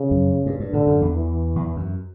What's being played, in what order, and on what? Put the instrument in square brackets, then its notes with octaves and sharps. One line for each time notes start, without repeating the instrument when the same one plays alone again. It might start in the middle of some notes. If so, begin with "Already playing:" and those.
Already playing: [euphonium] C#3
[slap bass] F#2
G2
G2
[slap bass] A2 [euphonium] D3
[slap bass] F#2
E2
[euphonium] E3
[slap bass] E2
F#2